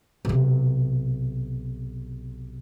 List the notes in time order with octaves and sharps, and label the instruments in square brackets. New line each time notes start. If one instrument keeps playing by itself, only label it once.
[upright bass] B1 C3